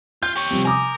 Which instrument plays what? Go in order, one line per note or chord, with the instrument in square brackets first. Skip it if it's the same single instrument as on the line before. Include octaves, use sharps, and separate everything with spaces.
[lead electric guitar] F4 [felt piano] G6
[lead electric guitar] G4 C#5
[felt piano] C3 F3 G3
[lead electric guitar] A#4 [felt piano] G#5 D6 D#6